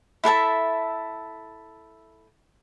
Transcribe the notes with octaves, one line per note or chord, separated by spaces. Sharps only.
E4 A4 E5 A5